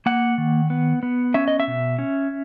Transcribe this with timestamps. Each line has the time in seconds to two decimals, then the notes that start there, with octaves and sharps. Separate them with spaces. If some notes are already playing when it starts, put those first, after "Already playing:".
0.06 A#3 F#5
0.38 D#3
0.70 B3
1.03 B3
1.34 C#4 E5
1.48 D#5
1.60 E5
1.67 B2
1.99 C#4